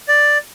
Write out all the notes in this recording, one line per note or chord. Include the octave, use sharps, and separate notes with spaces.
D5